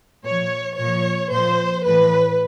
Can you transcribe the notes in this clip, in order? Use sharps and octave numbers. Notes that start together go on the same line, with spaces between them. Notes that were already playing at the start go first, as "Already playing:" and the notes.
A#2 F3 C#5
A#2 F3 C#5
A#2 F3 C5
A2 E3 B4